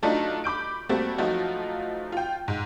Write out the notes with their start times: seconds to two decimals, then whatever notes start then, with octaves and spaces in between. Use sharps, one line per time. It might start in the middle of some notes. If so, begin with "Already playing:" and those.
0.02 F#3 A3 D4 D#4 F4
0.44 B5 D6 G6 D7
0.89 G3 A3 A#3 C4 F#4
1.18 F3 F#3 A3 D#4 F4 F#4
2.12 F4 G5
2.48 G#2